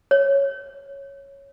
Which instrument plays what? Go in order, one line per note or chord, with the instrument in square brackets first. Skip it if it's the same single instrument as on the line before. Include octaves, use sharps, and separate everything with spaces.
[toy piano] C#5